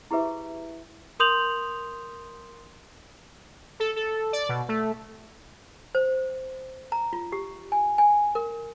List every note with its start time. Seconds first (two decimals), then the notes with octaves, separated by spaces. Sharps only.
0.11 E4 G4 G#4 B4 E5
1.20 A#4 C6 D#6 G6 F7 F#7
3.80 A4
3.96 A4
4.33 D5
4.49 B2
4.68 A3
5.95 C5
6.92 A#5
7.13 F4
7.32 G4
7.72 G#5
7.98 G#5
8.35 A#4